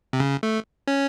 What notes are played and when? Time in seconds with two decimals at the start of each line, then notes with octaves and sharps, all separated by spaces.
0.13 C3
0.20 C#3
0.43 A3
0.87 C#4